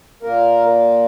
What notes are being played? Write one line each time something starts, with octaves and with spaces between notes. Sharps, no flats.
A#2 A#3 A#4